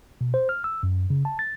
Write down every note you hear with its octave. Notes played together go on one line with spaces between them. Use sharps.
B2
C5
F6
E6
F#2
C#3
A5
A6